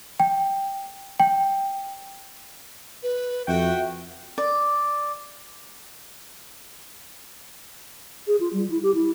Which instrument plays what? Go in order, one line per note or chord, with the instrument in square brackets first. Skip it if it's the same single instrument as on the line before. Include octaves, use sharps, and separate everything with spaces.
[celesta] G5
G5
[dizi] B4
[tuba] F2 [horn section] F#4 G5 [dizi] E5
[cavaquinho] D5
[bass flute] G#4
F4
G3
E4
G4
E4